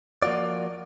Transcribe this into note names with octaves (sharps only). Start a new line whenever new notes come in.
F3 A#3 F4 F#4 D5